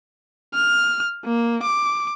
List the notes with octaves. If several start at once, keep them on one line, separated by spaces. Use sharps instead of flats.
F6
A#3
D6